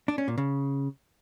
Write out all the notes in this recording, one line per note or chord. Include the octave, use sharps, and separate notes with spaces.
D4
C#4
A#2
C#3